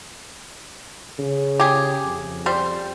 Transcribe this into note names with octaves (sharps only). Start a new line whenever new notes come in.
C#3
G4 G#4
F2
G3 C5